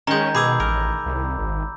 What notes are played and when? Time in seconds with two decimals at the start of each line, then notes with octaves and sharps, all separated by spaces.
0.07 D#3 G#3 C#4 A#5 G6
0.35 B2 G#4 B5 D6 E6
0.60 A1 A#4
1.06 C2
1.38 G#1